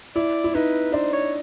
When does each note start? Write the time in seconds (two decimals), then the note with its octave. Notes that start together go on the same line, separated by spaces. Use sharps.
0.15 E4 D5
0.44 E4
0.54 D#4 B4
0.93 D4 C5
1.13 C#5